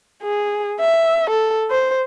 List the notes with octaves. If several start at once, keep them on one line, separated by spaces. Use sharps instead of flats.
G#4
E5
A4
C5